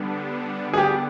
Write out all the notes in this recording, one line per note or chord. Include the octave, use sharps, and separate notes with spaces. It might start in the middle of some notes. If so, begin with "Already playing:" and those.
Already playing: D3 G3 B3 D4
G#4
G4